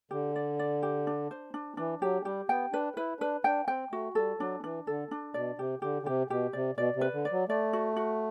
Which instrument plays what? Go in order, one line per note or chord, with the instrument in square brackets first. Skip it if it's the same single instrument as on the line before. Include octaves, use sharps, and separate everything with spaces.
[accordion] D3 [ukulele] G4
[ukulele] D5
D5
G4
D4
C5
D4
[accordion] E3 [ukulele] D4
[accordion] F#3 [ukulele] G4
[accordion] G3 [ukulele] G4
[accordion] B3 [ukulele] G5
[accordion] D4 [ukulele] B4
[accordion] E4 [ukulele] B4
[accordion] D4 [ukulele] B4
[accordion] D4 [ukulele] G5
[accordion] C4 [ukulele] G5
[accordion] A3 [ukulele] F#4
[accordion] G3 [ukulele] A4
[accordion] F#3 [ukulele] D4
[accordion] E3 [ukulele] D4
[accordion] D3 [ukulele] A4
[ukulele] D4
[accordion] B2 [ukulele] D5
[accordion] C3 [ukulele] G4
[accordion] D3 [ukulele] G4
[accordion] D3
[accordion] C3 [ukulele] G4
[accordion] B2 [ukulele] G4
[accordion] C3 [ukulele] D5
[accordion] B2 [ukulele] D5
[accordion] C3
[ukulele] B4
[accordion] D3
[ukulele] D5
[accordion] F#3
[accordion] A3 [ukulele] D5
[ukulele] F#4
F#4